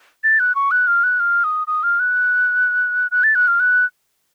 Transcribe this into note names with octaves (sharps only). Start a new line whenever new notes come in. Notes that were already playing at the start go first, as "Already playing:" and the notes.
A6
F#6
C#6
F#6
F6
F#6
F6
D#6
D#6
F6
F#6
F#6
A6
F#6
F6
F#6